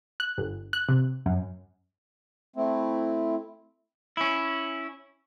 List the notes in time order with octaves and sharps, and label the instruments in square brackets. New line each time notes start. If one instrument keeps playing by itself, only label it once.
[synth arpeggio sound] F#6
G1
F#6
C3
F#2
[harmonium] A3 C4 E4
[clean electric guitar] C#4 E4